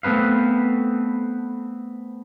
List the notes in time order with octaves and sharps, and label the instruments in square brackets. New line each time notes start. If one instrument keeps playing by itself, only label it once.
[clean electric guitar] A3 B3 C4 B4 F5